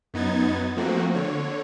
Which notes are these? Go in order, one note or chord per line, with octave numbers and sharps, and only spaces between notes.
F#2 B3 D#4 G#6 A6
F3 A3 A#3 C4 F#4
D3 C#5